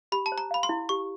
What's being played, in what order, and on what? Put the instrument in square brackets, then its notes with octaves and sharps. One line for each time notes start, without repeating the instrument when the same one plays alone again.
[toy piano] G4 [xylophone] B5
[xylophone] A5
[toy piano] C5
[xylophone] A#5
[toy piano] F5 [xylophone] B5
[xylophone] C6
[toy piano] E4
[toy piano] G4 [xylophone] C#6